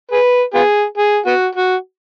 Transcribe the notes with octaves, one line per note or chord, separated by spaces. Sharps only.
G#4 B4
B3 F4 G#4
G#4
B3 F#4
F#4